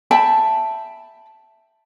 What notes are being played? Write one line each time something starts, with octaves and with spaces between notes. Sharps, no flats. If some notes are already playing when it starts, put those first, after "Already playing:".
E5 G5 A5 B5